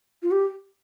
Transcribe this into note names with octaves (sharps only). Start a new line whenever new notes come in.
F4
G4